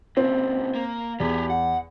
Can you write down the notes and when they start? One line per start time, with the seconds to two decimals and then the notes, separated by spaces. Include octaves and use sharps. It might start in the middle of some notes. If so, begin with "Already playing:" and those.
0.17 A#2 C#3 C4
0.75 A#3
1.20 E2 G4 G#4
1.50 F#5